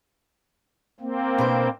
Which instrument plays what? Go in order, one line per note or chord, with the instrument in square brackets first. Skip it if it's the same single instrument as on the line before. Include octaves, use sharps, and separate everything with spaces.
[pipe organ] A#3 C4
[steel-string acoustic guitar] B2 D4 C5